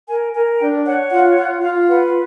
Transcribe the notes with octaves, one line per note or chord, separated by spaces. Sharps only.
A#4 G#5
A#4 G#5
D4 G5
C#5 F#5
F4 F#5
F4 F#5
F4 F5
B4 F#5